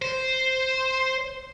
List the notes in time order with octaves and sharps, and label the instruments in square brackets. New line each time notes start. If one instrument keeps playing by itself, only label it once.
[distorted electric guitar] C5